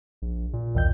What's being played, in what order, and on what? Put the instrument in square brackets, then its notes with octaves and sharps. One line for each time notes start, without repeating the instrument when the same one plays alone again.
[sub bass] A#1
A#2
[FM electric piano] B1 E2 G6